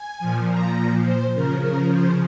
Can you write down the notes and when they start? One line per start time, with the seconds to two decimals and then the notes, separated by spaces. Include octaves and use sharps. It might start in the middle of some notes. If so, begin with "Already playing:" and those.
Already playing: G#5
0.20 A#2 F3
0.48 A#5
1.05 C5
1.34 C#3 F3 A#4
1.62 A#4
1.91 C5